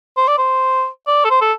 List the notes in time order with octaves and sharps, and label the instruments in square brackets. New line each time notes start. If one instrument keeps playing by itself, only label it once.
[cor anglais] C5
D5
C5
D5
A4
C5
A4